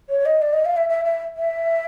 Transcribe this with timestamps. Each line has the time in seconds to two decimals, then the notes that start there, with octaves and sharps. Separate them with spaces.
0.09 C#5
0.26 D#5
0.42 D5
0.53 D#5
0.65 F5
0.77 E5
0.89 E5
1.05 E5
1.37 E5